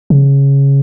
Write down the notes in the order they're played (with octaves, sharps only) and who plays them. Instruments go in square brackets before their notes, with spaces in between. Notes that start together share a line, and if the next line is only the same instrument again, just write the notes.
[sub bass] C#3